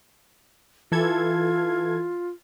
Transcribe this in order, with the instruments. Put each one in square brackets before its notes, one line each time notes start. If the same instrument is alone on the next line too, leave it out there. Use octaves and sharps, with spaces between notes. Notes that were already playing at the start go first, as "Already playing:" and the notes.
[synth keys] E3 A4 G#6 [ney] F4